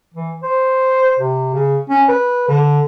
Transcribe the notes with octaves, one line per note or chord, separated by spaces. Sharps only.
E3
C5
C3
C#3
C#4
B4
D3